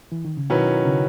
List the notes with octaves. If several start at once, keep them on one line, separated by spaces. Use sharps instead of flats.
E3
D#3
C#3
B2 D#3 F#3 C#4 E4 B4
C#3